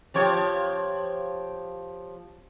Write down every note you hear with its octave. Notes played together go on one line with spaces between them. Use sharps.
F3 G4 C#5